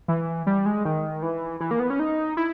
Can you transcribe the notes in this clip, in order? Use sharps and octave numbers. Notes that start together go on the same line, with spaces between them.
E3
G3
G#3
D#3
E3
E3
A#3
B3
C#4
D#4
E4